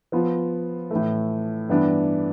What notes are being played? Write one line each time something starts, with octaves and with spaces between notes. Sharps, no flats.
F3 B3 F4
A2 E3 A3
G2 E3 B3 D4